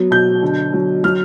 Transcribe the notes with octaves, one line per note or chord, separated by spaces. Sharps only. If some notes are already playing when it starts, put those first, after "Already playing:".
Already playing: F#3 B3
B2 G6
D3
F#3
F#3 F6